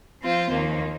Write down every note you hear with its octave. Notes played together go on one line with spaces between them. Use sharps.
F3 C4 F4 C5
D#2 D#3 A#3